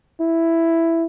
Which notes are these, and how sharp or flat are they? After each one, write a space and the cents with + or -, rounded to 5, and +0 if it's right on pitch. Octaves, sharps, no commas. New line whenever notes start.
E4 +5